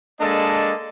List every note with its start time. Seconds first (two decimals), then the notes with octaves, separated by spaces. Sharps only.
0.20 G#3 A#3 D4 A4 D#5 A5